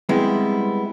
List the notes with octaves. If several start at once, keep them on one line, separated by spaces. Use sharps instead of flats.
G3 G#3 B3 C4 E4